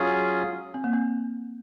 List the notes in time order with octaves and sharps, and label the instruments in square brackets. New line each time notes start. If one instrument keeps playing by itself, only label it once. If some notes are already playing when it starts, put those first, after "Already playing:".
Already playing: [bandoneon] F#3 C#4 F4 G#4
[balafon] C4
A#3
C4